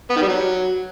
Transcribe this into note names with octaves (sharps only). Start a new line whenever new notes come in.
B3
D#3
G3
F#3